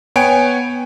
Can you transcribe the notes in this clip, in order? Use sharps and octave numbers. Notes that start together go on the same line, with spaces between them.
B3 C#5 G5 G#5 D7